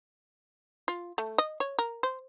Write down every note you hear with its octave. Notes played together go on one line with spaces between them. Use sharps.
F4
A3
D#5
C#5
A#4
C5